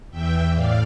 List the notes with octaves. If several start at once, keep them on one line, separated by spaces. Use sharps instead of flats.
E2 E3 E5 G5
A2 D5 F5